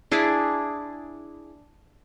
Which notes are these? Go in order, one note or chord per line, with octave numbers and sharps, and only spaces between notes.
D4 E4 G#4 D6